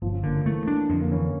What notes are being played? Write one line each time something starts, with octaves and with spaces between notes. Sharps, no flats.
G1 F3
C#4
D3 A#3
A3
E3 A3
D4
F2 D3
A#3
E3 C#4